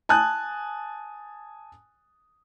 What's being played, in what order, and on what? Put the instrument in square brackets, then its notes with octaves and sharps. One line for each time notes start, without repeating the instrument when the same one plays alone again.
[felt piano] G#5 A5 D#6 F#6